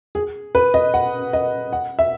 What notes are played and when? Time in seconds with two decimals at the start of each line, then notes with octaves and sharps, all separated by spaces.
0.15 G#4
0.55 B4
0.74 D#5
0.94 F#5
1.33 D#5
1.73 F#5
1.99 E5